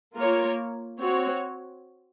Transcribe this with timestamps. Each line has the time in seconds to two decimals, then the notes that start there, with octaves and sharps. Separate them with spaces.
0.15 A#3 F4 A#4 C#5
1.00 C4 F#4 C#5